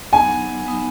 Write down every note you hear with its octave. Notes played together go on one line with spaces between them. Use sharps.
F#3 B3 D#4 G#5
F#3 B3 D#4